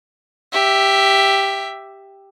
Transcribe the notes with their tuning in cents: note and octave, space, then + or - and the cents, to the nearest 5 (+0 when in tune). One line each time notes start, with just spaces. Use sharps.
G4 +0 E5 +5